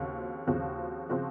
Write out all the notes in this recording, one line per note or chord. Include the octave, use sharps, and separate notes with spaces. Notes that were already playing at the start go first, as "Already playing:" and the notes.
Already playing: D#2 C#3 F3 C4 F#4
D#2 C#3 F3 C4 F#4
C#3 F3 C4 F#4